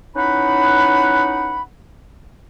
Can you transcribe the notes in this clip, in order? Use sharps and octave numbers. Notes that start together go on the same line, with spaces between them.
C#4 D#4 E4 B4 F#5 B5